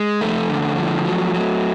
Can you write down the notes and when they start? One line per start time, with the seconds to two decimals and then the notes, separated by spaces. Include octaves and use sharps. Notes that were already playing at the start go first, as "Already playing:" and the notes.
Already playing: G#3
0.21 F2 A3
0.50 D3
0.78 F3
1.05 F#3
1.34 F#3